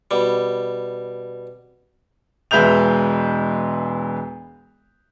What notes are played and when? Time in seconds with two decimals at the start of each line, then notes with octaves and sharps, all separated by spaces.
0.11 B2 G3
2.51 E1 G#3 B4 E5 G6 F7